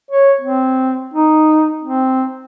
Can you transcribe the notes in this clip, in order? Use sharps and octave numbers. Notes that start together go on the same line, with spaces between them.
C#5
C4
D#4
C4